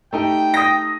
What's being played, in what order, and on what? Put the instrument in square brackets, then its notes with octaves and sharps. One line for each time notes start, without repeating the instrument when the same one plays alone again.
[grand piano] A3 D#4 G4 [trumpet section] G5
[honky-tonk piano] D#6 A#6